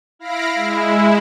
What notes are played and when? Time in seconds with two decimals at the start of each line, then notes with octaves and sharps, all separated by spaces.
0.19 E4 F5 B5 A#6 C7 D7
0.55 G#3 E4